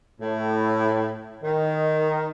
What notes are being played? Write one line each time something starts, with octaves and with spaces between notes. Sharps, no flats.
A2
D#3